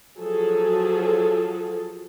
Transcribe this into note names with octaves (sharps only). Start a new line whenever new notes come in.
F3 F#3 G#4 A4